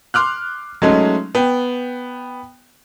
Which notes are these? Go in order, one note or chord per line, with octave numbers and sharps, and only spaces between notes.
C6 D6 F6 F#6
F#3 G#3 A3 C#4 D#4
B3 G5